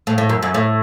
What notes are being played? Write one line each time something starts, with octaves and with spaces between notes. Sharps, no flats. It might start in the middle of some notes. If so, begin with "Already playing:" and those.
A2
A2
F#2
F#2
A2